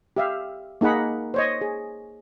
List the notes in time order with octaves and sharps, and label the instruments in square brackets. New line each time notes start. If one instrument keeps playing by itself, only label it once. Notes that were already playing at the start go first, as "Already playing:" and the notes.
[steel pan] G4 E5 F5
A#3 D#4 G#4 F#5 B5
C5 C#5 D#5
G#4